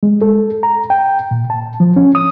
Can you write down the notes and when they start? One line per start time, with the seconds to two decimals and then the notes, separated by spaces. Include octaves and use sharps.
0.03 G#3
0.22 A4
0.63 A#5
0.90 G5
1.31 A#2
1.50 A5
1.80 F3
1.96 C#4
2.15 D#6